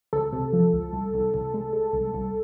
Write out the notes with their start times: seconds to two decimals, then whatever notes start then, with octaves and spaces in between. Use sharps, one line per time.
0.13 C#2 A4
0.32 C3
0.53 F3
0.73 C#2
0.93 C2
1.14 C2
1.34 C2
1.54 G#3
1.73 G#3
1.93 C2
2.14 C2